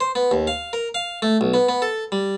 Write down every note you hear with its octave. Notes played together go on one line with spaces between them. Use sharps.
C5
B3
D#2
F5
A#4
F5
A3
B1
B3
B3
A4
G3